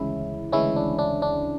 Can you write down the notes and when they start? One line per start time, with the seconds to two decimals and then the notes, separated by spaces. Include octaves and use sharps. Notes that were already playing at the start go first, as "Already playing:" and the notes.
Already playing: D2 C#3 E3 G#3 C#4 E4
0.52 D2 C#3 E3 G#3 C#4 E4
0.76 D4
0.99 D4
1.22 D4